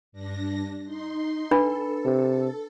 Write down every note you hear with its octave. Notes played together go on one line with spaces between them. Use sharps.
G2 D4 A#6
D#4 C6
D4 A4 B4 B5
C3